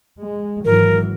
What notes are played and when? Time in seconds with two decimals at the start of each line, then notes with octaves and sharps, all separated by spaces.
0.21 G#3
0.65 G#1 E3 F#3 A#4